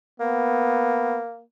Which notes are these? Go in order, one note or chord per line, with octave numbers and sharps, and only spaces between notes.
A#3 B3